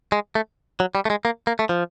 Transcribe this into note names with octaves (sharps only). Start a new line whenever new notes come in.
G#3
A3
F#3
G3
A3
G#3
A#3
A#3
A3
F3